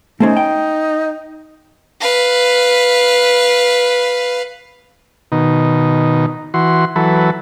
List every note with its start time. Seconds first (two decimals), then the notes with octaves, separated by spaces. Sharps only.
0.20 A3 C4 C#4 D#4
0.37 G5
2.00 B4 F5
5.32 B2 D#3 D#4
6.54 E3 F#4 C6
6.96 E3 F#3 A4 B4